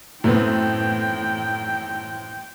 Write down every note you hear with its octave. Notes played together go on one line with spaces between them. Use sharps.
F#2 A2 A3 B3 C4 B4 G5